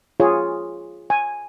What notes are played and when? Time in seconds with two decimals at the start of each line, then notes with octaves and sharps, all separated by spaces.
0.20 F4 G#4 C#5
1.10 G#5